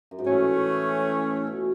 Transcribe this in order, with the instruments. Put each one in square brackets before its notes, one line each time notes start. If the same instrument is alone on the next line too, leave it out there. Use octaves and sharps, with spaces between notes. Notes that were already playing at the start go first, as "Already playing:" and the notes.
[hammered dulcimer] F#2
G#2
[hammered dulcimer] A2 [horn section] E3 A3 C#4
[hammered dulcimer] B2